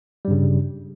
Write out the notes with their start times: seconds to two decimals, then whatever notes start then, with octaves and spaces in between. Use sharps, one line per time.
0.25 G3
0.28 G2
0.31 C#3